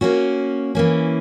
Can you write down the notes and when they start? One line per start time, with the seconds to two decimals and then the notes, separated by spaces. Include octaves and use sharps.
0.01 A#3 C#4 F#4
0.75 E3 A#3 C#4